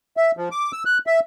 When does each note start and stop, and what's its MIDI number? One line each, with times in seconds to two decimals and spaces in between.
0.17 0.31 76
0.37 0.49 53
0.51 0.72 86
0.73 0.83 88
0.86 0.98 90
1.07 1.20 76